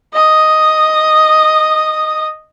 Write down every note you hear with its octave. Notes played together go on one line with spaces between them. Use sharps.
D#5 D#6